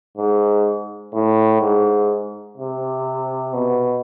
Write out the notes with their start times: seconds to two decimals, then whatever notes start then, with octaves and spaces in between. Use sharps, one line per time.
0.17 G#2
1.13 A2
1.61 G#2
2.58 C3
3.53 B2